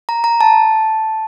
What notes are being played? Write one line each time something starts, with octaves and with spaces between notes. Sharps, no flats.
A#5
A#5
A5